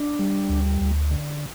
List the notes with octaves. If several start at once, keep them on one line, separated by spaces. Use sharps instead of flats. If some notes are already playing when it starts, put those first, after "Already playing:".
Already playing: D4
G3
D2
D2
D3